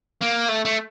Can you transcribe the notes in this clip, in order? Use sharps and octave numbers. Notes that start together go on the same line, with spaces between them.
A#3
A3
A3